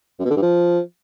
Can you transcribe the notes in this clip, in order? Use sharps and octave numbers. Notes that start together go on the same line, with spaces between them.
F#2
B2
D3
G2
F3